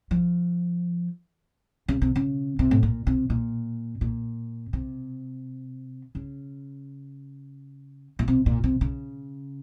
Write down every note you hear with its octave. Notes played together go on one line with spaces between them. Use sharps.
F3
C#3
C3
C#3
C3
A2
A#2
C3
A#2
A#2
C3
C#3
A#2
C3
A#2
C3
C#3